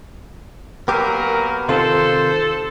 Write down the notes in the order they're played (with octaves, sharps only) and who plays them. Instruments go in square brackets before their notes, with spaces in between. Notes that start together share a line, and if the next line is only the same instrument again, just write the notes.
[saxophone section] A#2 F#3 [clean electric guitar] B3 G4 [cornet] A#4
[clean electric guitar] C3 D#3 F4 [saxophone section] A4 [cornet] C5